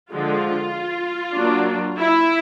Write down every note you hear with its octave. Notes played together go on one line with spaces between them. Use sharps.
D3 F3 G#3 F4
F#3 A#3 D4
E4